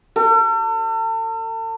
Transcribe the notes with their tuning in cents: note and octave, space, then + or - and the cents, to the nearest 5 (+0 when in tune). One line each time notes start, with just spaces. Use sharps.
A4 +40